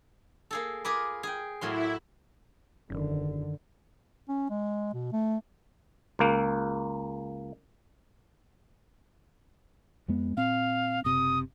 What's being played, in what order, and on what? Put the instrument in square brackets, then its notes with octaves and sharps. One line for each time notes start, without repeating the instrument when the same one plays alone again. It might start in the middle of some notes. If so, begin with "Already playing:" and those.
[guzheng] A#3 G#4 A4
[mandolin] F4 D6 [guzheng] G#4 A#4 B4
[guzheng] G#4 G5
[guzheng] A2 F#3 C6 [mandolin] A#3 F#4 F6 [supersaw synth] E4
[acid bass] E1 [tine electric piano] F#2 D#3 [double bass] D3
[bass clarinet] C#4
G#3
B2
A3
[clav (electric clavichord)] C#2 A#3
[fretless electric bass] F2 G#3 B3
[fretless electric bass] A#2 C4 [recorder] F5
[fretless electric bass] F#1 C3 [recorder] D#6